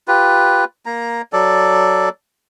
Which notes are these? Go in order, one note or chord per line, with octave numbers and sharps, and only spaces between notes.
F4 G4 B4
A#3 A#5
F#3 A4 D5